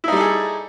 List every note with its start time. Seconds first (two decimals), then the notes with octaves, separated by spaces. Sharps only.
0.04 E4
0.08 D#4
0.12 G3
0.16 A4
0.21 G#4